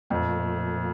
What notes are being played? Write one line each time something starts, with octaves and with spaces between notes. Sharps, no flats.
F2 A#2 F3 A3